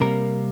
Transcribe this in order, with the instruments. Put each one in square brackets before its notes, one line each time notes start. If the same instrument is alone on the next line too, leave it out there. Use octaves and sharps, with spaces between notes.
[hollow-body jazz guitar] C3 G3 A#3 A#4